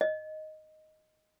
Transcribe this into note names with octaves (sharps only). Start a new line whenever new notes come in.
D#5